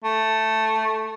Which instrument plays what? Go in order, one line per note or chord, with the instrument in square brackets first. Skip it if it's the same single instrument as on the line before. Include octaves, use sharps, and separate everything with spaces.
[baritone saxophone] A3